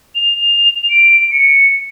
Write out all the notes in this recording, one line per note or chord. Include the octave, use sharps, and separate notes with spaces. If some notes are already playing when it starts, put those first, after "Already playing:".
F7
D7
C#7